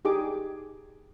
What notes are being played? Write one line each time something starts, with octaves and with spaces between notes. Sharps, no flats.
D#4 G4 G#4 D6